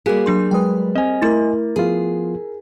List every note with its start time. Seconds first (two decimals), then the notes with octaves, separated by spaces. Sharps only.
0.06 G3 A#3 F#4 G#4 F5 F#6
0.26 F#3 D4 C6
0.51 F#3 G#3 B4 G5 D#6
0.95 C4 C5 D#5 G#5
1.22 A3 E4 A#4 C6 A6
1.76 F3 B3 F4 G#4